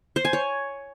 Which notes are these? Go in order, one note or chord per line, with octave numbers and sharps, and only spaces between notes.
C5
G#5
C#5